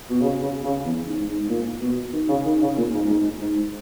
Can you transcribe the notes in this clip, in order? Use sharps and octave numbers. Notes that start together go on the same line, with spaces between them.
B2
C#3
C#3
C#3
E2
G#2
G#2
A#2
B2
D#3
C#3
D#3
C#3
A#2
G#2
G#2
G#2